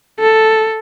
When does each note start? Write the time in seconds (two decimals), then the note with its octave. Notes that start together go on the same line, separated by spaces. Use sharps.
0.20 A4